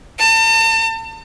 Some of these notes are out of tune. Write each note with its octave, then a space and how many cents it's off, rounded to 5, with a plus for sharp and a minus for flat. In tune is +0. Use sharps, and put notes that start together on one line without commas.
A5 +40